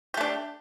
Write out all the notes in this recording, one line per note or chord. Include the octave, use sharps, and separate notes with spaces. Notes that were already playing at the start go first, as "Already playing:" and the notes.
A3 D4 G4